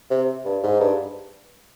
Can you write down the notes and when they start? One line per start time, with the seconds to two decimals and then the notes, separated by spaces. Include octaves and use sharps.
0.10 C3
0.45 G2
0.63 G#2
0.80 G2